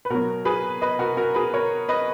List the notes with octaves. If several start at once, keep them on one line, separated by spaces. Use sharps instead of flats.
B4
B2 F#3 F#4 A#4
G#4 B4
B4 D#5
F#4 A#4
F#4 A#4
G#4 B4
A#4 C#5
B4 D#5